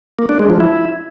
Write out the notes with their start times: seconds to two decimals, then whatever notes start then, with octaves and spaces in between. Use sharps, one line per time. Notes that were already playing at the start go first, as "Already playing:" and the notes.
0.19 A#3
0.29 D4
0.39 G#3
0.50 F3
0.60 E4